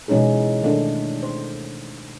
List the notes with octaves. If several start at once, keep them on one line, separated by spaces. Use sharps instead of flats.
B2 E3 G#3 C#4 D#4 G#4
D#3 A3 D4
C5